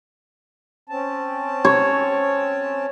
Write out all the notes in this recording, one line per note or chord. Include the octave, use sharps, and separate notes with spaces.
C4 C#4 A5
C#5